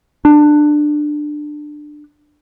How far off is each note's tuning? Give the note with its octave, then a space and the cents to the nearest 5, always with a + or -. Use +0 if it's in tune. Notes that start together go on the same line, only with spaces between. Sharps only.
D4 +20